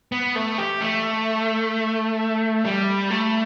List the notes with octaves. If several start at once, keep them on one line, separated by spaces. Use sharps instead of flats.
B3
A3
G4
A3
G3
A3